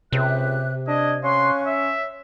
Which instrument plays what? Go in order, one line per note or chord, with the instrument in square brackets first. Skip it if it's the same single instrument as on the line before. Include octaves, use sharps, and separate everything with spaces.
[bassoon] C#2 [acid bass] C3 [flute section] G4 E5 F#6
[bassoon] D4 [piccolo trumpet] D#5 [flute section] G#6
[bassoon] C#4 [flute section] F5 C#6 F#6 [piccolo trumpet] C6
[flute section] C#5 [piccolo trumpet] E5